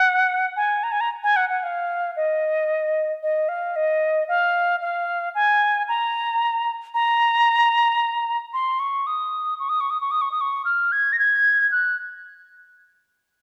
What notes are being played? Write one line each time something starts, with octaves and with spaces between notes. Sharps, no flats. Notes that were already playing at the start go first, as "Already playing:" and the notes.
Already playing: F#5
G#5
A#5
G#5
A#5
G#5
F#5
F#5
F5
D#5
D#5
F5
D#5
F5
F5
G#5
A#5
A#5
C6
C#6
D#6
C#6
D#6
C#6
D#6
C#6
D#6
C#6
D#6
C#6
F6
G#6
A#6
G#6
F#6